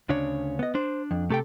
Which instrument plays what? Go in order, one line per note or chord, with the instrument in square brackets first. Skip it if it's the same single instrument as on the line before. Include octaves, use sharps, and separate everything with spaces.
[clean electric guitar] D2 C#3 C#5 [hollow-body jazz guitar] D4
[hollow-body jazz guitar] B3 D#5
[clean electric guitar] D4 [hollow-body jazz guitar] C5
[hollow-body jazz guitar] F2
[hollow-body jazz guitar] C3 A4 [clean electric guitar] A3 G4 G5